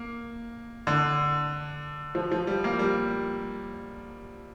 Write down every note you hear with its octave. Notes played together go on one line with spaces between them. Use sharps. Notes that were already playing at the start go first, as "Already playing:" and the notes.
Already playing: A#3
D3
F3
F3
G3
A#3
G3